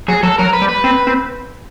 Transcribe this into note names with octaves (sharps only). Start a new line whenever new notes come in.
F#3 G#4
F#3 A4
F#3 A#4
B4
G3
B4
C4
C4